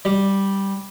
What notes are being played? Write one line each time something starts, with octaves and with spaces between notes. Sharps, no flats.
G3